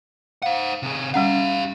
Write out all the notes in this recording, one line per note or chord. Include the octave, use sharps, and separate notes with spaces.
C5 F5 F#5
C3 G#4
G3 C#4 G4 F5 F#5